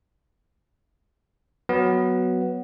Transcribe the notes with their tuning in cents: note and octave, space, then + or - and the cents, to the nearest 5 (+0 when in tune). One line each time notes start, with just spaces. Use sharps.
F#3 +0 B3 +0